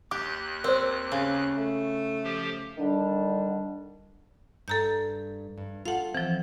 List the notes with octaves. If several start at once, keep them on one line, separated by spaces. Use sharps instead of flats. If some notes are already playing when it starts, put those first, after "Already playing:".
D#2 G4 D6 F#6
C4 A#4 C5
C#3
A3
F3 G4
D3 D#3 G3 D4
G2 A4 A#5 G6
G2
F4 A4 F5 F#5
E3 F3 C4